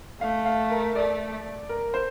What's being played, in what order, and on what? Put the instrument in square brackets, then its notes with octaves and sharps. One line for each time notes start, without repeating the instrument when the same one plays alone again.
[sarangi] A3 [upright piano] F5
[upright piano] F5
A#4
[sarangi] A3 [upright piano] D5
[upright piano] A#4
C5